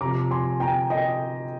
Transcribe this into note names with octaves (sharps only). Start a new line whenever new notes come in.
C3 F3 A#5 D6
G#5 C6
G5 A#5
D#5 G5